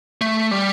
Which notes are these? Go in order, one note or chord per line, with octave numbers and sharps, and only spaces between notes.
A3
G3